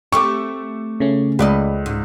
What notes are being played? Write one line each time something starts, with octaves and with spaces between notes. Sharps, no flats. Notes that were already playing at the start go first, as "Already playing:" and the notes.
A3 C4 G4 C#6 D6
C#3 A3 C#4
C#2 B4 D5 D#5
G#2